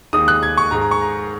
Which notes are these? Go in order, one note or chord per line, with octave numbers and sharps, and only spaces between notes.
D#2 D#3 G#3 D#6
F#6
G#6
C#6
G#2 G#3 A#5
A#5
C#6
A#5